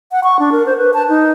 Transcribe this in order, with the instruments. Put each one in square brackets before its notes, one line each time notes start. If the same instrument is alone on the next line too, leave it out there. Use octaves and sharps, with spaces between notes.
[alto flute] F#5
C#6
D4
A#4
C5
B4
A5
D#4